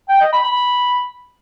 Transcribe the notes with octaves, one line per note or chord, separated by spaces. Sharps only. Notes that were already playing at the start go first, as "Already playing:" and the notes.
G5
D#5
B5
B5